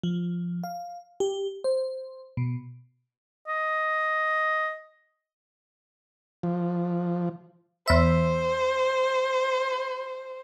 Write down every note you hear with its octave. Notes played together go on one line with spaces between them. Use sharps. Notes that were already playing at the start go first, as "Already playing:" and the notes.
F3
F5
G4
C5
B2
D#5
F3
E2 C5 E5